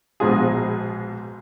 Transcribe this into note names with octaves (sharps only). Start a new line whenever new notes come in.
A#1 G#2 B2 G#3 F4 G#4